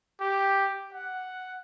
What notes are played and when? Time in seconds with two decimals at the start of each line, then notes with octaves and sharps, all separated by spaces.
0.20 G4
0.94 F#5